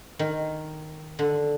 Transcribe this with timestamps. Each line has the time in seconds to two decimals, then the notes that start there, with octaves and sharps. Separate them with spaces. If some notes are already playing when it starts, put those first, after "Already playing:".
0.19 D#3
1.19 D3